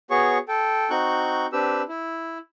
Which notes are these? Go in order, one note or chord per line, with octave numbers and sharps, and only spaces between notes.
B3 F#4 G#4 C#5 C#6
A4 G5
C4 D#4 F#4 C#6 F#6 G6
C4 D4 G4 B4 E6
E4